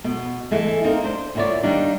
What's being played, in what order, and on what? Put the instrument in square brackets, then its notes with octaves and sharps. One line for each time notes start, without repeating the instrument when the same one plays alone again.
[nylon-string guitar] B2 B3
E3 G#3 A3
A#3 C4 D#4 A#4
D4 C5
D2 A#2 E4 A#4 C#5 D5
D#3 G3 A#3 D4 D#4